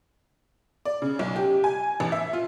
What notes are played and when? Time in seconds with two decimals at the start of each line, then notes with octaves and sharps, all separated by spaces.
0.85 D5
1.02 C#3
1.19 B1
1.36 G4
1.64 G#5
2.00 A1
2.12 E5
2.33 F4